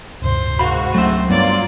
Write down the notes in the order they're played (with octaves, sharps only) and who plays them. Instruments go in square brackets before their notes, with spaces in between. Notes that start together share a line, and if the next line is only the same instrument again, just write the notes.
[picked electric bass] D1 G2 C3 [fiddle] C5
[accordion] G#2 F#4 [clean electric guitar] A#4 F5 B5
[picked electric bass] C#2 F#3 C#4 [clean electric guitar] A3 E5 [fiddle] C4
[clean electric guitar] G2 [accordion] F#3 A#3 F4 [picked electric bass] B3 [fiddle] D5